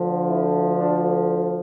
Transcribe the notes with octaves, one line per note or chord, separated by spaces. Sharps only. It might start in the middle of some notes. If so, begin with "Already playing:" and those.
Already playing: D2 D3 F3
E4
D4